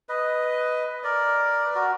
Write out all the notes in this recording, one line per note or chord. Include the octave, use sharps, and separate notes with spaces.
B4 D#5
A#4 D5
B4
F#4 A#4